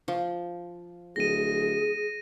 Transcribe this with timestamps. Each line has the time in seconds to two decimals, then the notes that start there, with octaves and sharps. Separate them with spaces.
0.08 F3
1.16 D1 G#4 A#6 D#7